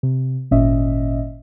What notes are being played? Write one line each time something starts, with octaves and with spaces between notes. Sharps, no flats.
C3
G#1 A#2 C#4 D#5 E5